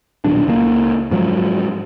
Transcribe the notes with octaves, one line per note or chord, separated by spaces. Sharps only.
D#1 B1 D4
C#2 A#3
G#2 F3 F#3